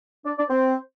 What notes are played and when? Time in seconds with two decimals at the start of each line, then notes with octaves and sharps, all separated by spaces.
0.26 D4 D5
0.37 D4 D5
0.49 C4 C5